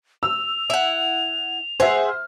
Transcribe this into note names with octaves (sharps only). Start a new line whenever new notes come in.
E6 F7
E4 F#5
G#4 C5 E5 F#5
F6